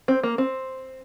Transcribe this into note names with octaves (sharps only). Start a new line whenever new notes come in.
C4
A#3
C4